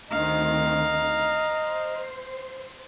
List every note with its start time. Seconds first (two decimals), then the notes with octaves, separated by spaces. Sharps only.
0.11 D2 D#3 C4 D#5 F5 A#5
1.53 C5